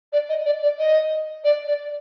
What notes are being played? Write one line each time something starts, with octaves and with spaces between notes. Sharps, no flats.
D5
D#5
D5
D5
D#5
D5
D5